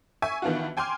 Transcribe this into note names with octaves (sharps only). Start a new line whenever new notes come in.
E5 G#5 C#6
D#3 E3 B3 D4 F4 F#4
G5 G#5 C6 D6 F6